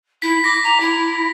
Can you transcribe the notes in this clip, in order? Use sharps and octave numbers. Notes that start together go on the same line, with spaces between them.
E4 B6
D6 A#6
A#5
E4